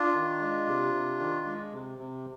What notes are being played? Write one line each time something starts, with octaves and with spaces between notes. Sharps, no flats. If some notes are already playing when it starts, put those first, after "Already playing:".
Already playing: D4 F4
D#3
G#3
C3
C3
D#3
G#3
C3
C3